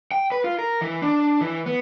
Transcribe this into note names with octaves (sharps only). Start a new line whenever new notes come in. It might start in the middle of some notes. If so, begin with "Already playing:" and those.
G5
B4
F4
A#4
E3
D4
E3
B3